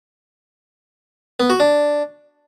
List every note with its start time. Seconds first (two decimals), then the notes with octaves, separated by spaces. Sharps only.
1.40 B3
1.50 F#4
1.60 D4